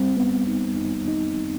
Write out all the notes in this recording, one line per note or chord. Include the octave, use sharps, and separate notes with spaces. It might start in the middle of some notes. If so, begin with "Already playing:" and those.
Already playing: G3 C4
B3
D#4
D#4
D#4